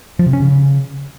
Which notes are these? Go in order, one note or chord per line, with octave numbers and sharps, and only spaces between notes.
F3
C3
C#4
C#3